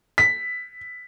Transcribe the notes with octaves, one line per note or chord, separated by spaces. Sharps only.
B6